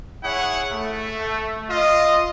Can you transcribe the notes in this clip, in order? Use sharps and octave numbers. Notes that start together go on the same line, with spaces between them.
E4 G#4 C#5 F#5
A3
F4 D#5